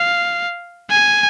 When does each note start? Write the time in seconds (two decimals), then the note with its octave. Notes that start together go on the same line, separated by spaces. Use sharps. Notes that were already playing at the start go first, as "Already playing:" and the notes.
Already playing: F5
0.90 G#5